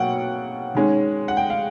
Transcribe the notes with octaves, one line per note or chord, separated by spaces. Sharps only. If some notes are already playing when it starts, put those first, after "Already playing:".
Already playing: B2 F#3 A#3 F#5 G5
D#3 G#3 C#4
F#5
G5
F5